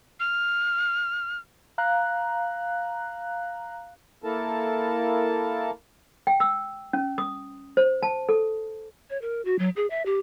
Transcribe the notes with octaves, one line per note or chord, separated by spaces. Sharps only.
F6
F5 A#5 F#6
A#3 E4 A4 A#4 A5
G5
E6
C#4
D#6
C5
A5
A4
C#5
A#4
F#4
F#3
G#4
E5
G4